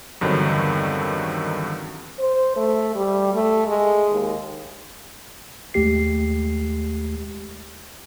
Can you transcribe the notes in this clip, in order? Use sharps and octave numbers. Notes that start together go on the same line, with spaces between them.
E2 G2 D3 D#3 F#3 C4
C5
A3
G3
A3
G#3
D#2
D#2 G#3 A3 G4 C7